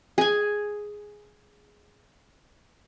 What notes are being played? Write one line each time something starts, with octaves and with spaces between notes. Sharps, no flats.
G#4 G#5